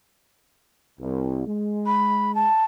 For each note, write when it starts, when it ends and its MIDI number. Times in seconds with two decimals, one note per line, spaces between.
1.00 1.42 36
1.46 2.46 56
1.86 2.34 83
2.35 2.65 81